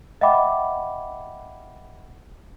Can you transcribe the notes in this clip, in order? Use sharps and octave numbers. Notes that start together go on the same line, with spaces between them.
D#5 E5 F#5 G5 B5 D6